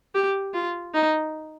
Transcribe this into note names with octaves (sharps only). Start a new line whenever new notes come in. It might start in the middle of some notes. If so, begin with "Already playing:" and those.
G4
F4
D#4